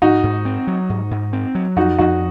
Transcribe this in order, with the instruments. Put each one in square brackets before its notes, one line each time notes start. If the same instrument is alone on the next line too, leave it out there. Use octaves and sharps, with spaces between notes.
[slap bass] G#2 [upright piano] D#4 F#4
[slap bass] G#2
C4
F#3
G#2
G#2
C4
F#3
[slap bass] F2 [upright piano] D#4 F#4
[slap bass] F2 [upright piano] D#4 F#4